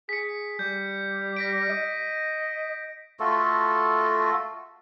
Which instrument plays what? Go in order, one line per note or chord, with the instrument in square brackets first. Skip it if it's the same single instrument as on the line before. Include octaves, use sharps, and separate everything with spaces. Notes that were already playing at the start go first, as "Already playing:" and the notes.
[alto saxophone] G#4 [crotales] B6 C#7
[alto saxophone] G3 [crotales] G6
[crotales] A#6 B6 D7
[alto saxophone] D#5
[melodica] A3 F4 F#4 A4